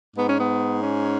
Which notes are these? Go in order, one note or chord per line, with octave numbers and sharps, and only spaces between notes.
G#2 B3
C#4
B3
C#4